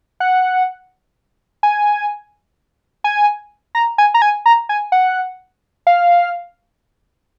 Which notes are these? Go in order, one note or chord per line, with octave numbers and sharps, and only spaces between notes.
F#5
G#5
G#5
A#5
G#5
A#5
G#5
A#5
G#5
F#5
F5